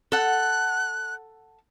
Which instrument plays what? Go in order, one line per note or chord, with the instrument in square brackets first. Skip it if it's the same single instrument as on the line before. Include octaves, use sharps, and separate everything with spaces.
[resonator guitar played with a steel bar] A4 F#5 [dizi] F#6